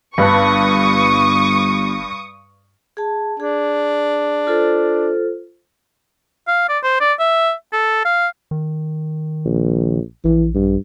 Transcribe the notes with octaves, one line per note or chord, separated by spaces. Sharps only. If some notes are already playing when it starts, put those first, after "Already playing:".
G1 G2 B4 A5 C#6 D#6
G#4 A5
D4 G#4
F4 A4 C5
F5
D5
C5
D5
E5
A4
F5
D#3
A#1
A#1 E3
G2